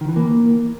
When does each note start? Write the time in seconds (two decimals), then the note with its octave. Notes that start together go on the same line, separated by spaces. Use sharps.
0.01 D#3
0.09 E3
0.16 A#3